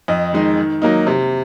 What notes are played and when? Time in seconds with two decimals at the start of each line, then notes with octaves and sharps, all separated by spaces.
0.08 F2 D#5
0.33 D#3 G#3 D#4
0.57 D#3
0.82 F#3 A#3 D#4
1.07 C3